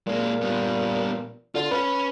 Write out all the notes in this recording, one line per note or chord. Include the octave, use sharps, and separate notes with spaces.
A#2 G#3 A#3
G3 B3
D3 F4
C#4 B4